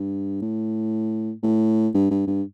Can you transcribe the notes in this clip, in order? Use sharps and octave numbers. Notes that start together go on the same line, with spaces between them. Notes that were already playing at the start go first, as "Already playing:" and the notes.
Already playing: G2
A2
A2
G2
G2
G2